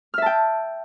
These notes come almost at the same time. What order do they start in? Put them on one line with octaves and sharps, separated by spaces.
F6 E5 A5 G5